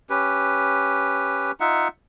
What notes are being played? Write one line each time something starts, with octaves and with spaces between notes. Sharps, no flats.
C#4 G4 B4
D#4 F4 E5 F#5